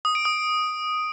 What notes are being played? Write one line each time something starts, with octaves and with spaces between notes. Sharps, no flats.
D#6
D7
D#6